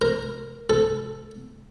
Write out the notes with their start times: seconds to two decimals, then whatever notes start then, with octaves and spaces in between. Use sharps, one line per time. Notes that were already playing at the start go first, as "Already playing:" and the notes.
0.01 A#4
0.70 A4